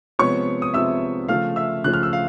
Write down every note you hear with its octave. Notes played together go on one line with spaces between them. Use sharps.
C3 F3 G#3 B3 C#5 C#6
D#6
C3 F3 G#3 B3 E5 E6
C#3 F3 A3 F5 F6
E5 E6
C#3 F3 A3 F#6
F6
E6
F5